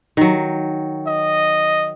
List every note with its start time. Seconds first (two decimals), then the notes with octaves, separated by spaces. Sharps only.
0.17 D#3 F#3
1.07 D#5